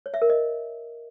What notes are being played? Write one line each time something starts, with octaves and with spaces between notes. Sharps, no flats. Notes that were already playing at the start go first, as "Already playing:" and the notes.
C#5
E5
A#4
D#5